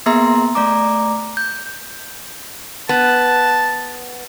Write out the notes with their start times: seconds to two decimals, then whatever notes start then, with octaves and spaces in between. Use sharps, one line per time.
0.06 A#3 B3 G#4 E5 A#5 C6
0.55 A3 D5 A#5 D6
1.37 G6
2.89 B3 A5